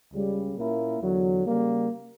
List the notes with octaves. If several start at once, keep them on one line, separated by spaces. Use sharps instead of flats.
C#2 C#3 G3
A#2 A#3 C#4 E4 A#4
E2 D3 F#3
C#3 G3 A#3